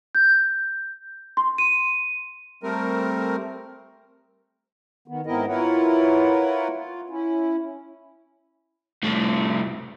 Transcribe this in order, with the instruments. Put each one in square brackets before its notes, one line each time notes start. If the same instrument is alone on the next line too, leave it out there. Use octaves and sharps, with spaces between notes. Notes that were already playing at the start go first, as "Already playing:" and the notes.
[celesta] G6
C6
D#7
[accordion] G3 A3 C4 A#4
[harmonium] D#3 B3
G#2 B3 C4 E4 A#4 D#5
E4 F4 A#4 B4 C#5 F#5
F4
C#4 E4
[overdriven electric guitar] C2 A3